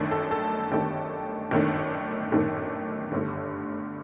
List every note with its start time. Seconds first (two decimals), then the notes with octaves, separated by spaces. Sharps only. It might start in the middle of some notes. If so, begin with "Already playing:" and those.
Already playing: G1 F#2 D#3 A3 D4
0.11 A4
0.31 A4
0.71 G1 F#2 D#3 A3 D4 G4
1.51 G1 F#2 D#3 A3 D4
2.32 G1 F#2 D#3 A3 D4
3.12 G1 G2 D3 A3